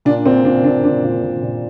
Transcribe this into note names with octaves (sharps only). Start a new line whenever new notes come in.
A#2 D4
A#2 C4
A#2 D4
A#2 D4
A#2 D4
A#2
A#2
A#2